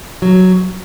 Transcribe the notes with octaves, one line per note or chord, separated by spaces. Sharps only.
F#3